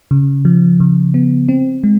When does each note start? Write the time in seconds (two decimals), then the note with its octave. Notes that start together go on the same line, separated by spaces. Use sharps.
0.11 C#3
0.45 F3
0.80 C#3
1.14 B3
1.49 C4
1.84 G#3